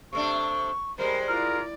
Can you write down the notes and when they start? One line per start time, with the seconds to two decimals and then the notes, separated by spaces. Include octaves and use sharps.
0.13 C3 A3 D4 C#6
0.99 G3 G#3 A#4 C5
1.29 E4 F4 A#4 D5